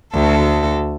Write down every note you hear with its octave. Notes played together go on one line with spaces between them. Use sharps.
D2 A4